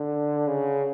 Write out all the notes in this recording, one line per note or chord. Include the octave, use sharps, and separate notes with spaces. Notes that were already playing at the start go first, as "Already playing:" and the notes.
Already playing: D3
C#3